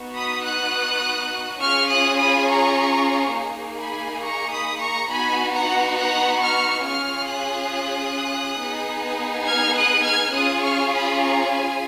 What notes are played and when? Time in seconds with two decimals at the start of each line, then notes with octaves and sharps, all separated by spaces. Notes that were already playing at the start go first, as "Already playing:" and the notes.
Already playing: B3 D#4 F#4
0.14 B5 D#6
0.44 D#6 F#6
1.60 C#4 F4 G#4 C#6 F6
1.89 D#6 F#6
2.18 B5 D#6
2.47 A#5 C#6
3.35 A#3 D#4 G#4
3.79 G#5 B5
4.23 A#5 C#6
4.52 B5 D#6
4.80 A#5 C#6
5.09 B3 D#4 F#4 G#5 B5
5.53 F#5 A#5
5.97 F#5 A#5
6.41 C#6 F6
6.83 C#4 F4 G#4 C#6 F6
7.27 D#6 F#6
8.58 B3 D#4 G#4
9.46 F6 G#6
9.76 D#6 F#6
10.04 F6 G#6
10.33 C#4 F4 G#4 D#6 F#6
10.62 C#6 F6
10.92 B5 D#6
11.21 A#5 C#6
11.50 G#5 B5